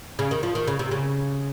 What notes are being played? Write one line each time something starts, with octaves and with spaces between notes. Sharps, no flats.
C#3
D#3
F3
D#3
C#3
C3
C#3